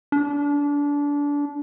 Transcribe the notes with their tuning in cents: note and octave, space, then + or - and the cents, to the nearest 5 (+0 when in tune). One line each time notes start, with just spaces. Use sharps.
D4 -25